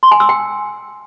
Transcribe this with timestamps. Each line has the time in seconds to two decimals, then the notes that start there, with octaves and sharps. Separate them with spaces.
0.03 C6
0.11 G#5
0.20 E6
0.29 G5